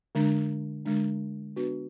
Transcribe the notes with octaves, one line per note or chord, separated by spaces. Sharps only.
D3 G#3 D4
D3 G#3 D4
B3 D4 F#4 B4